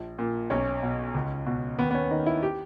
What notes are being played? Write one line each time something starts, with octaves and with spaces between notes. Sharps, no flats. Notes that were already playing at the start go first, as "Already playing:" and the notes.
Already playing: A#1
A#2
B1 C#4
B2
C#2
B2
D#2 B3
B3
C#4
D#3 D#4
E4
G4